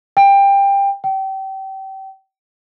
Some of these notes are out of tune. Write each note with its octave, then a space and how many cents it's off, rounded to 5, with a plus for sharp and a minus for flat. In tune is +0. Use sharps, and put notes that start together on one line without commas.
G5 +20
G5 -30